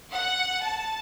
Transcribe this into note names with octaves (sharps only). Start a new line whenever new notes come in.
F#5
A5